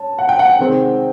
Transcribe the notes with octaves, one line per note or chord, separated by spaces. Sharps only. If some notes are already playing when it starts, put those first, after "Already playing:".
Already playing: C#4 A5
F#5
G5
F#5
G5
C3 D#3 G#3 C4